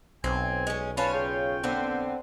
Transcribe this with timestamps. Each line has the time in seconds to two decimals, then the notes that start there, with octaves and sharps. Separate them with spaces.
0.24 B1 C4 G#5
0.67 G#3 C#4
0.97 C#4 F4 B4 C#5 A5
1.13 C#3 G5
1.63 D3 B3 C4